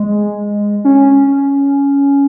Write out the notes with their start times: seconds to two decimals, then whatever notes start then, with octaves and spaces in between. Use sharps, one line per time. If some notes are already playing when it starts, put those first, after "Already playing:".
Already playing: G#3
0.85 C#4